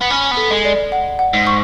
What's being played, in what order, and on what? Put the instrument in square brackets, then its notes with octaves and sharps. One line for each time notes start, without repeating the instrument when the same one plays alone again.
[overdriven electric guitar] B3
[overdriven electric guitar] C#4 [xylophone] B5
[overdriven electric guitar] B3
[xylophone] A4
[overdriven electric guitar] G#3
[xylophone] D5
F#5
F#5
[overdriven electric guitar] G#2
[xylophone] C#6